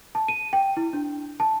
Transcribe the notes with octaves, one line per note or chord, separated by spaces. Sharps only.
A5
D#7
G5
E4
D4
A5